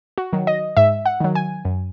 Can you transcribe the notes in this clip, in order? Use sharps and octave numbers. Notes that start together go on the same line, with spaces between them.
F#4
D#3 F#3
D#5
G#2 E5
F#5
D#3 F#3
G#5
F#2